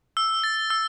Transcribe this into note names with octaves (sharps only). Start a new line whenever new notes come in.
E6
A6
E6